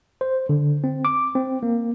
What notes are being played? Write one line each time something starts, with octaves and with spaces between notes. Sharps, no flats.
C5
D3
C4
D6
C4
A#3